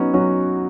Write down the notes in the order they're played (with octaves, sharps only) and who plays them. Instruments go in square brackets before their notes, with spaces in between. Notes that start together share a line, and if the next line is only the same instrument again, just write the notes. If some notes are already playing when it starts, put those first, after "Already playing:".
Already playing: [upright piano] F#3 [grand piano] B3 C#4 D#4
[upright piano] F#3 [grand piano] C#4 F#4